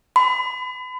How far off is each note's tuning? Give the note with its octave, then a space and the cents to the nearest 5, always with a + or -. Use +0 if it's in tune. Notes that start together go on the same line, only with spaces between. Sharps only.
B5 +35